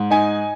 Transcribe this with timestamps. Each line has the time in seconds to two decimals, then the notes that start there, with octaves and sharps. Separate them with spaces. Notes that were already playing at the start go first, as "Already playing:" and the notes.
Already playing: G#2
0.10 D#4 G#5